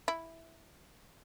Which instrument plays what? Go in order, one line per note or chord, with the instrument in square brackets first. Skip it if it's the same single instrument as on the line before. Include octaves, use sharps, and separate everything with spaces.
[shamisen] E4